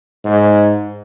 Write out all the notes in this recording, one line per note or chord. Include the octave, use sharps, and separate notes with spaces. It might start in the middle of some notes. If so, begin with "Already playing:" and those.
G#2